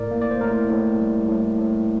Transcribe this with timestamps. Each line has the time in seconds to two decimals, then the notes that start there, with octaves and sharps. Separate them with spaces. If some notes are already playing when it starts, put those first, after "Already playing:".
Already playing: A2 A#4 D5
0.11 A#3
0.22 D5
0.31 C5
0.41 A2 A#4
0.70 A2
1.00 G3
1.29 A2
1.59 A2